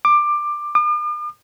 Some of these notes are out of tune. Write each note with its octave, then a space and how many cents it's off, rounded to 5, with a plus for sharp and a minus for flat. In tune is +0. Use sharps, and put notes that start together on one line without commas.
D6 +15
D6 +45